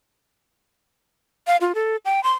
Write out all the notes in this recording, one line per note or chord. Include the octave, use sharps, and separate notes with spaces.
F5
F4
A4
G5
C6